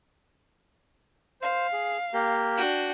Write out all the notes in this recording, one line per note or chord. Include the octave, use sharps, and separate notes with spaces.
C5 F5
G#4
A#3 G4 A#4
D4 F#4 G5